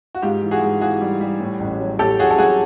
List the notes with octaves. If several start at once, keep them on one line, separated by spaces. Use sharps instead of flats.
F#4
G#2 F4 G4
E3
F#4 G#4
G#2
E3 F#4 G#4
G3
G3
A2
A1
F#3
A2 G4 A4
A1 F#4 G#4
A4
F#3 F#4 G#4